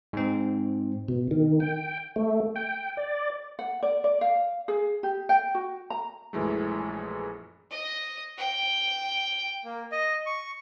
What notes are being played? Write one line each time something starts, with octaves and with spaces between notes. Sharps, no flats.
G#2 C4
B2
D#3
G5
A3
G5
D5
F#5
D5
D5
F5
G#4
G4
G5
F#4
A#5
A#1 F#2 E3 G#3 A3
D#5
G5
A#3
D#5
C#6